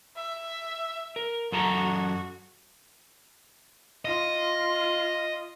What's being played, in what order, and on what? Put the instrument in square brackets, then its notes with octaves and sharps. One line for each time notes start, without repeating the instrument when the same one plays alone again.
[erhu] E5
[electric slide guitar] A#4
[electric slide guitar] F#2 A4 A#5 [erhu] F#4
[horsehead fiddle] F4 [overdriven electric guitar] D#5